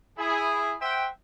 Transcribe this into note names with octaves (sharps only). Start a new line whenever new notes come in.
E4 G#4
C5 E5 F#5 G5